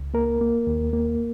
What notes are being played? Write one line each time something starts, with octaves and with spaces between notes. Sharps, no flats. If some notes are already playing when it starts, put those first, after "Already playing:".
Already playing: C#2
A#3 A#4
A#3
D#2
A#3